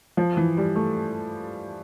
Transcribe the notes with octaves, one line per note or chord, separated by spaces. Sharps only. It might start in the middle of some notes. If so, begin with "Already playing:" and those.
F3
E3
G3
A3